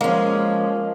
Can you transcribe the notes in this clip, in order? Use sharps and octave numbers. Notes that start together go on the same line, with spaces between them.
F3 G#3 A#3 C#4